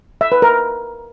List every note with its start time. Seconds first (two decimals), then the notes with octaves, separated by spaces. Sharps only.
0.21 E5
0.32 B4
0.42 A#4